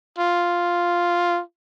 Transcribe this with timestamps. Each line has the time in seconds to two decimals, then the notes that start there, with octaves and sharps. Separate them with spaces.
0.19 F4